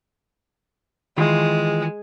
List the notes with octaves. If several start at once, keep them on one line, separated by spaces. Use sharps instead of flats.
D#3 E3 G#3 F4